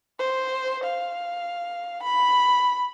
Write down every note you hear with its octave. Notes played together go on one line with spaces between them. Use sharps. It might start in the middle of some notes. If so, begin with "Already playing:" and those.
C5
F5
B5